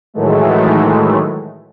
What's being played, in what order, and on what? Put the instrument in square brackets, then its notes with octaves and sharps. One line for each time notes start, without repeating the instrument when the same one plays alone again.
[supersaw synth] A2 D#3 E3 F#3 G#3 A3